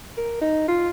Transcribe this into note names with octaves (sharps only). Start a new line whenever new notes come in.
A#4
D#4
F4